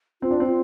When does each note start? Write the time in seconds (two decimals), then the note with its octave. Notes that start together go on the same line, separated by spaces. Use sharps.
0.22 C4 F4
0.31 D4
0.40 C4
0.47 F4